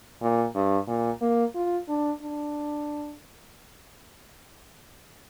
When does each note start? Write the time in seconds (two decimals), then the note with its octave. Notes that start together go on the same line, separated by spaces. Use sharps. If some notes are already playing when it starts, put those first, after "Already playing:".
0.22 A#2
0.55 G2
0.88 A#2
1.21 A#3
1.55 F4
1.88 D4
2.22 D4